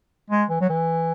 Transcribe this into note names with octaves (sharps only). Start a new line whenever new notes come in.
G#3
E3
F#3
E3